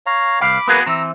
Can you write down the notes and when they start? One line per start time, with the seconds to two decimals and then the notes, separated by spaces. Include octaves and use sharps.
0.06 C#5 F5 A#5
0.41 C2 F5 B5 D6
0.68 A#3 B3 F#4 G#4 B4
0.86 E3 C4 A#5 E6